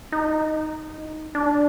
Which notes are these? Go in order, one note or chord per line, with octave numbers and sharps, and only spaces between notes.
D#4
D4